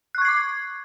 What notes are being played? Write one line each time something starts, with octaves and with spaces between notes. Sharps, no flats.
C#6 D6 F#6 G#6 C7